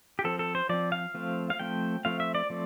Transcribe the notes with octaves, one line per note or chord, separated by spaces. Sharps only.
G4
F3 C4 A4
A4
C5
F3 C4 D5
F5
F3 A3 C4
F5
F3 A3 C4 G5
F3 A3 C4 F5
E5
D5
F3 A3 C4